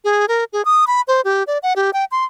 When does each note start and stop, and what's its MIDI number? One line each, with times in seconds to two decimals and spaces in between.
0.04 0.26 68
0.28 0.44 70
0.53 0.65 68
0.65 0.85 87
0.87 1.01 83
1.08 1.21 72
1.25 1.43 67
1.47 1.58 74
1.63 1.73 78
1.76 1.90 67
1.93 2.05 79
2.11 2.24 84